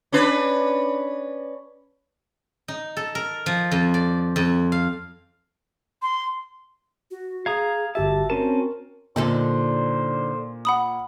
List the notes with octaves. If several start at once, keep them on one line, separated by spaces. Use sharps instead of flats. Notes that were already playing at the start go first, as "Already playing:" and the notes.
C#4 D4 B4
D#4
A4
A#4
F3
F2
D5
F2
F5
C6
F#4
G#4 F5 A#5 D#6 G#6
G1 F#4 G4 E5 A5
C4 C#4 A#4 A5
A#2 D3 D#4 A4 C5
F#5 B5 D#6